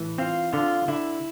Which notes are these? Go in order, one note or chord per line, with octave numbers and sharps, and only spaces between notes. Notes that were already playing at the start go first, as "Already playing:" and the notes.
Already playing: A2 E3
C4 F4
D3 F4
D3 E4